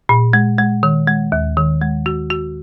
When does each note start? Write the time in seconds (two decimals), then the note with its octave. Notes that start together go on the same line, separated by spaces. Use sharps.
0.09 A#2
0.33 G#3
0.58 G#3
0.83 D#3
1.07 G#3
1.32 D#2
1.57 D#3
1.82 G#3
2.06 F#4
2.30 F#4